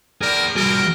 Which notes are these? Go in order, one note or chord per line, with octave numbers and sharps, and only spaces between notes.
G#4 A#4 D5
F3 G3 F#4 G#4 A#4